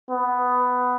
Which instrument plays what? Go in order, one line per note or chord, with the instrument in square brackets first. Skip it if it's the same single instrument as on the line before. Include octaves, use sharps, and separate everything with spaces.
[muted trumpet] B3